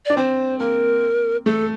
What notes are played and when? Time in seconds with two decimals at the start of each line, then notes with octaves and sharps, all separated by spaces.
0.05 D4 D5
0.17 C4 C5
0.59 A#3 A#4
1.46 A3 A4